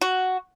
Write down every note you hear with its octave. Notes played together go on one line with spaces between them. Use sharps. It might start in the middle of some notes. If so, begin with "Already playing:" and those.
F#4